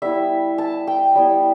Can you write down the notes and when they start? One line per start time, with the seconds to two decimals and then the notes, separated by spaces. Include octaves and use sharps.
0.02 G3 B3 E4 E5
0.58 A5
0.87 G5
1.15 G3 B3 E4